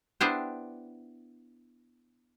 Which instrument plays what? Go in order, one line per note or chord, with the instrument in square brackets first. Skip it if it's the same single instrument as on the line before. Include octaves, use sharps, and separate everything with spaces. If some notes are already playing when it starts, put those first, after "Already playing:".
[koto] B3 D4 E4 G4 C5